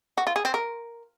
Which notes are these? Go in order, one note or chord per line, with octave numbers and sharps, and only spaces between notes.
F#4
F4
G#4
C4
A#4